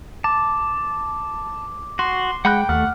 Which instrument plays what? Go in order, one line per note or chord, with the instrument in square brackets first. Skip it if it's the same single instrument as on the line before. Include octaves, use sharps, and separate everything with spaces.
[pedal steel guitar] A5 [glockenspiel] D6
[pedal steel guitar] F#4 [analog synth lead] C6
[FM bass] G#3 [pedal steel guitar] F#5 B5 F#6 [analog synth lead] G5
[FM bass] D#2 [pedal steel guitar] A3 [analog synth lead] F#5 [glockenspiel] F6